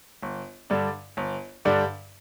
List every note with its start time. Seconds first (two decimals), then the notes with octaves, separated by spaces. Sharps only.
0.22 G1
0.70 G2 D3 G3 D4
1.17 G1
1.65 G2 D3 G3 D4